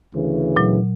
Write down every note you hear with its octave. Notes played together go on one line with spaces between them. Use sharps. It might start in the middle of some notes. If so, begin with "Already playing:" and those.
D2 C#3 E3
A#2 F#3